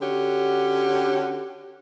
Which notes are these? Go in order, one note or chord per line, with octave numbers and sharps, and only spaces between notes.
D3 C#4 F#4 G4